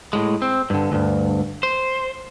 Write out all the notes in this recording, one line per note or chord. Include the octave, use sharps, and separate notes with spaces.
A2 G#3
C4
G2 D3
D2 G2
C5